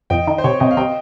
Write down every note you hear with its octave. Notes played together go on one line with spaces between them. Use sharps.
F2 D#5 G5
D#3
C5
C3 C#5
C3 C5 D#5
F5
C3 D#5 G5